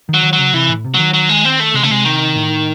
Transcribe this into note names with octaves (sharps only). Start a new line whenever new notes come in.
D#3
F#3
D#3
F#3
C#3
C3 E3
A2
C3
D#3 F#3
F#3
G#3
C4
A3
C3 G#3
C#3 A3
C3 G#3
D#3
A2